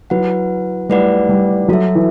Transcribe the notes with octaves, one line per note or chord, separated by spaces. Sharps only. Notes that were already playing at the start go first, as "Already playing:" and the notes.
F#3 E4 B4 F#5
G3 A3 E4 B4 D5 F#5
G3
F#3 F#4 A4 E5
E3